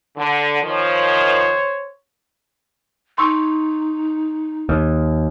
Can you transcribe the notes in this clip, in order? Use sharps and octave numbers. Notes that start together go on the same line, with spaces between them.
D3
D#3 F3 C5 C#5
D#4 C6 C#6 E6
D#2